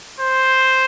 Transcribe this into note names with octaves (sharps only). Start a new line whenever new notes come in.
C5